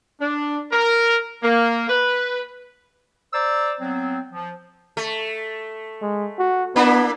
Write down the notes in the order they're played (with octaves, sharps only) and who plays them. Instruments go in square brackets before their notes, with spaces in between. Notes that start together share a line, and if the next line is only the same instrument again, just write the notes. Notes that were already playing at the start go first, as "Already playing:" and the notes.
[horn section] D4
A#4
A#3
B4
[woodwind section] C5 D5 A#5 E6
F#3 B3 C4
F3
[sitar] A3
[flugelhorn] G#3
F#4
[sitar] A#3 D4 E4 [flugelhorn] B3